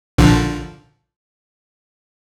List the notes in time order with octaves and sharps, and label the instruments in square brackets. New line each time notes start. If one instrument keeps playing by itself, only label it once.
[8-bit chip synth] A#1 D3 F3